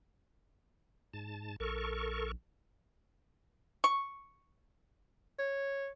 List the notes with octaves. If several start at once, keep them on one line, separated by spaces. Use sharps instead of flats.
G#2 A5
A#1 A4 A#4 C#6
C#6
C#5